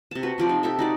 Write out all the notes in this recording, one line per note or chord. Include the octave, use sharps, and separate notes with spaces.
C3 A5
F#4 B4
C3 F3 D5
D#4
G4 A4 E5
D#4 F#4 D5